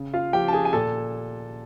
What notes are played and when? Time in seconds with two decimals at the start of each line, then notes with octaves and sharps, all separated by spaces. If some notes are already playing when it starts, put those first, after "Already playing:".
Already playing: C#3
0.14 F4 F5
0.33 F3 G4 G5
0.48 A5
0.53 G#4 G#5
0.65 G#5
0.73 A#2 A4 A5